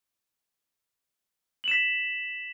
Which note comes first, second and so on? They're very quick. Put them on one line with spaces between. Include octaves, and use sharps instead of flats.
F#7 E7 B6